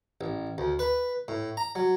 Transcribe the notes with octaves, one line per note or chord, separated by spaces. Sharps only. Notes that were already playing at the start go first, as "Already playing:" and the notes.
A1
D2
B4
A2
A#5
F#3